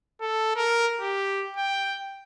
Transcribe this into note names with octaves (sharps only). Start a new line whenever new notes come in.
A4
A#4
G4
G5